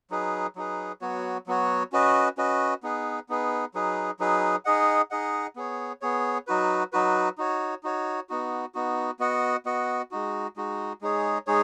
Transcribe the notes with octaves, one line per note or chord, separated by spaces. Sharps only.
F#3 D#4 G#4 B4
F#3 D#4 G#4 B4
F#3 B3 F#4 C#5
F#3 B3 F#4 C#5
C#4 F#4 B4 D#5
C#4 F#4 B4 D#5
B3 D#4 G#4 B4
B3 D#4 G#4 B4
F#3 D#4 G#4 B4
F#3 D#4 G#4 B4
D#4 G#4 D#5 F#5
D#4 G#4 D#5 F#5
B3 G#4 C#5
B3 G#4 C#5
F#3 D#4 F#4 B4
F#3 D#4 F#4 B4
D#4 F#4 C#5
D#4 F#4 C#5
B3 D#4 F#4
B3 D#4 F#4
B3 F#4 D#5 F#5
B3 F#4 D#5 F#5
G#3 D#4 F#4
G#3 D#4 F#4
G#3 D#4 G#4 C#5
G#3 D#4 G#4 C#5